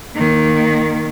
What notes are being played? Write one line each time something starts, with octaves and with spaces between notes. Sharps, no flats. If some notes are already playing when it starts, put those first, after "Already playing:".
D#3 A#3